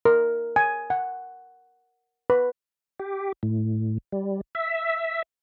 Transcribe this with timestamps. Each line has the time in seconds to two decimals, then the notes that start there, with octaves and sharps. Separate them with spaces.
0.05 A#4
0.56 G#5
0.90 F#5
2.30 B4
3.00 G4
3.43 A2
4.12 G3
4.55 E5